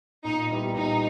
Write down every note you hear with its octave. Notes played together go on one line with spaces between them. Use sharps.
A#2 D#4
G3 B3 E4 G4
A#2 D#4